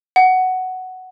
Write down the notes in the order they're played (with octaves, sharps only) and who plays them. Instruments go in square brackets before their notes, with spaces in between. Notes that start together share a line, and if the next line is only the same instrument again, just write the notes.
[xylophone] F#5